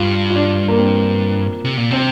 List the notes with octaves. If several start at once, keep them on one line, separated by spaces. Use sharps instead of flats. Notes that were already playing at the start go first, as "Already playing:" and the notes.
Already playing: G2 F4
F4
D4
A#3
C4
C3
A#2
C3 C4